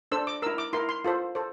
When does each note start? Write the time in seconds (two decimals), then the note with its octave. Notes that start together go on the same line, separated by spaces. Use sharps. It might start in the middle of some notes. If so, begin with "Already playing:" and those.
0.12 D4 A4 C5 E6
0.27 D6
0.42 A#4 E6
0.46 E4
0.58 D6
0.73 E4 A#4 C6
0.89 C6
1.05 F4 A4 C5
1.35 A4 C5